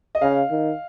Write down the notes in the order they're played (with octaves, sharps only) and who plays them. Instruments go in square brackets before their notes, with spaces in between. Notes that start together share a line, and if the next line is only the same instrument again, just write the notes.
[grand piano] D#5
[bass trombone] C#3 [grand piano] F5
[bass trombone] D#3